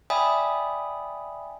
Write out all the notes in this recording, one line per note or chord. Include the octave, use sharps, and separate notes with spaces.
D5 E5 G5 G#5 B5 D#6